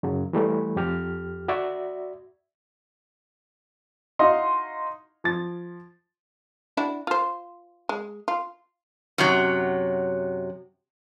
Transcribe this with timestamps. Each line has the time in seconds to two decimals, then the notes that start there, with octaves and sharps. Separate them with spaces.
0.03 F#2 C#3 F#3
0.33 E3 G3 A3
0.76 F2 G4 F6
1.48 F#4 D5 E5
4.19 D#4 E4 F#4 D#5 F5 C6
5.24 F3 A6
6.77 D4 E4 F#4
7.07 F4 C5
7.89 G#3
8.28 F4
9.18 F#2 C3 F#3